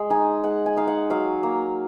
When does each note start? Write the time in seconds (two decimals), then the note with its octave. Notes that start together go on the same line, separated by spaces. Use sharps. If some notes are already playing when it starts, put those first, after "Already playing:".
Already playing: G#3
0.10 D#4 G#5
0.43 G#3 F#5
0.66 G#5
0.77 D#4 F5
0.87 F#5
1.10 F#3 F5
1.43 A#3